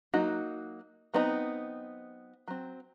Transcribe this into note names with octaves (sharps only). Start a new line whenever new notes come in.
F#3 A#3 D#4 F#4
F#3 B3 C4 D#4
F#3 C4